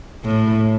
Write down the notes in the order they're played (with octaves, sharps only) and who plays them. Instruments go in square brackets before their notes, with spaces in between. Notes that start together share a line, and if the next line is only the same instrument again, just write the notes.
[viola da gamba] A2